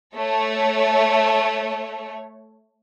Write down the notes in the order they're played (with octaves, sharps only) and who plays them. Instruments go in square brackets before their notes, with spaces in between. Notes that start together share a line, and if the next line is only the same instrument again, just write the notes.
[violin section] A3 C#5